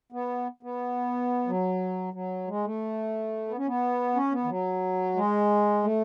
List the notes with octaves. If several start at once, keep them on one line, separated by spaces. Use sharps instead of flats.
B3
B3
F#3
F#3
G#3
A3
B3
C#4
B3
C#4
B3
E3
F#3
G#3
A3